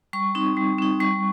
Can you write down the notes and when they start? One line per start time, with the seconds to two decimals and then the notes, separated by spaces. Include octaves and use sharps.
0.13 G3 C#6
0.35 C4 D#4
0.57 G3
0.78 C4 D#4
1.00 G3 C#6